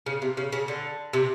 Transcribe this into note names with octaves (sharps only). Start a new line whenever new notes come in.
C#3
C3
C#3
C#3
D3
C3